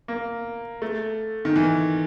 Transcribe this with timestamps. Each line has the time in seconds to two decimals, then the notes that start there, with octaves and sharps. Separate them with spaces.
0.08 A#3
0.82 A3
1.45 D#3
1.56 E3